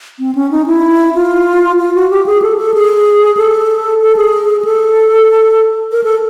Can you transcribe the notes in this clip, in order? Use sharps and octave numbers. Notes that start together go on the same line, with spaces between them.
C4
C#4
D#4
E4
F4
F4
F#4
G4
G#4
A4
A4
G#4
A4
A4
G#4
G#4
A4
A#4
A4